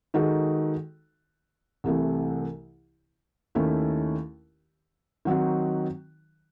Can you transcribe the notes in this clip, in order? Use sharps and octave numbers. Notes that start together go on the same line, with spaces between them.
D#3 G#3 D#4 F#4 A4
C2 C3 E3 A3
D#2 D#3 A3 C#4 E4
D#3 F#3 C4 D#4 F#4